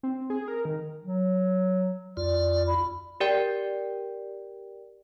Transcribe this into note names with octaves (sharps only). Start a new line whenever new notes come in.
C4
G#4
A#4
D#3
F#3
F2 F4 D5
B5
G4 A#4 D5 G5